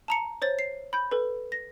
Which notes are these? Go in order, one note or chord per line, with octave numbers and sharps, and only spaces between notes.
A5 A#5 C#7
C5 C#5 A6
C7
B5 G6
A4 B4
A#6